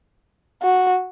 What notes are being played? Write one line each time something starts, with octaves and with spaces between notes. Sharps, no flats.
F#4